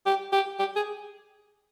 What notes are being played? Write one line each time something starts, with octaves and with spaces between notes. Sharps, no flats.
G4
G4
G4
G#4